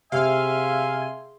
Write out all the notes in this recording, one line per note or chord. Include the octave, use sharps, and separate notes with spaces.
C3 G#4 E5 F5 G#5 C6